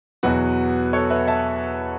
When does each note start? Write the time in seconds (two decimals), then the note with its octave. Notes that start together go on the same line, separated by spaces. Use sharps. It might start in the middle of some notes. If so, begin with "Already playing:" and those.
0.23 E2 B2 F#3 F#4 B4
0.93 A4 C#5
1.10 B4 E5
1.28 E5 A5